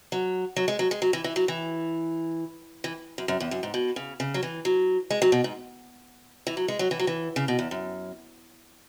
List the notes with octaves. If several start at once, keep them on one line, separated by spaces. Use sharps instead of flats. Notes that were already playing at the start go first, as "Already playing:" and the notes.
F#3
F#3
G#3
F#3
G#3
F#3
E3
E3
F#3
E3
E3
F#2
F#2
E2
F#2
G#2
B2
C#3
C#3
F#3
E3
F#3
G#3
F#3
B2
G#2
E3
F#3
G#3
F#3
E3
F#3
E3
C#3
B2
E2
F#2